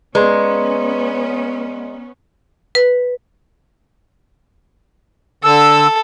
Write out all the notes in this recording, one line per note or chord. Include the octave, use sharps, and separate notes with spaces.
G#3 B3 C#4 B4 D5 A#5 C6
B4
D3 A4 E6